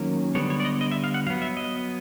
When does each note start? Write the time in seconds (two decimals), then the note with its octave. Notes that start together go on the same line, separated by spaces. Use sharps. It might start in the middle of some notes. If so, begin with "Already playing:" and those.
Already playing: D#3 F#3 A#3 C#4
0.35 D3 G3 B3 C#5
0.50 C#5
0.60 D5
0.65 D#5
0.81 D#5
0.92 E5
1.04 F5
1.14 F#5
1.26 F#3 F5
1.30 B3
1.42 E5
1.57 D#5